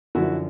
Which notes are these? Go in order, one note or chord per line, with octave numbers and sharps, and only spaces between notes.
F#2 D3 F3 E4 F#4